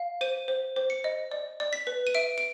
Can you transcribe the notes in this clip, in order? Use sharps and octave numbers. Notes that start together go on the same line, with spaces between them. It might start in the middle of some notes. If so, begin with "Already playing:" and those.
Already playing: F5
C5 D#7
C5
C5
C#7
D#5
D5
D5
B6
B4
D#7
E5 D7
D7